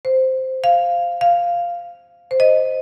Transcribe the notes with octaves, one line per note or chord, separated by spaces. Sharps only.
C5
F5
F5
C5
D#5